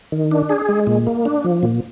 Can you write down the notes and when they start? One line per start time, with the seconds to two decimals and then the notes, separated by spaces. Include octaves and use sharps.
0.12 D#3
0.31 D4
0.49 G#4
0.69 G#3
0.87 A#2
1.07 A#3
1.25 D4
1.44 F3
1.63 A#2